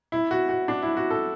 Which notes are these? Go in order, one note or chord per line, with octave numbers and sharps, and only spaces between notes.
E4
F#4
F#4
D4
E4
F#4
A4